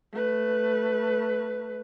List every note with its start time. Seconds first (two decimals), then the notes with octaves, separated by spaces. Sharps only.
0.13 A3 B4